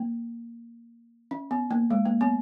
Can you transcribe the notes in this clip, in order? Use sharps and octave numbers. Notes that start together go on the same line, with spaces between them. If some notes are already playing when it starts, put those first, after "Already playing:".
Already playing: A#3
C#4
B3
A#3
G#3
A#3
B3